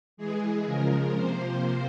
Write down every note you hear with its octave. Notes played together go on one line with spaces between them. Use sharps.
E3 G#3 G#4
C#3 F3 G#3 A#4
C3 F3 A#3 C5